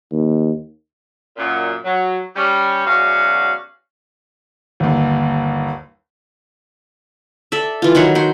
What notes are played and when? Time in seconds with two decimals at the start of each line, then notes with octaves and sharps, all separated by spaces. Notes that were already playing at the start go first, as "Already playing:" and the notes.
0.12 D#2
1.37 F#2 A#2
1.84 F#3
2.36 G3 C#4
2.86 E2 F#3 C#4 F#4 D5 F5
4.80 G1 D#2
7.52 A4 D5 E5
7.82 E3 F4
7.95 D#3 F#3 B4 C#5
8.15 F#3 G5 C6